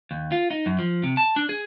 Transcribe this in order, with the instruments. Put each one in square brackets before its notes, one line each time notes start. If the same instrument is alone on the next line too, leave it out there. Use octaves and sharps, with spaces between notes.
[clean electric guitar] D#2
F4
D#4
F#2
F3
C3
A5
D4
G#4